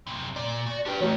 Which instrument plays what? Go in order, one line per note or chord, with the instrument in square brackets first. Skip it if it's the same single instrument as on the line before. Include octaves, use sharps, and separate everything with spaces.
[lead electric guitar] F#2 C3
[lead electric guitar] A#2 [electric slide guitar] D5
[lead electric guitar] F#4
[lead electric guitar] D4 G5 [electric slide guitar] G4 B4
[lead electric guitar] D#3 G4 [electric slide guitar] E3 A3 [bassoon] F#3